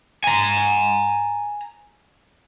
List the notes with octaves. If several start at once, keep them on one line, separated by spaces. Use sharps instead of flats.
G#5 A#5